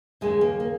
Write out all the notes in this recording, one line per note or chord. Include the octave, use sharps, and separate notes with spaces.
D#2 C#3 G#3
A#3
A#3